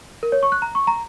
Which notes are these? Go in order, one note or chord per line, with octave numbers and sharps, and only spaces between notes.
A#4
C#5
C#6
F#6
A#5
C#6
A#5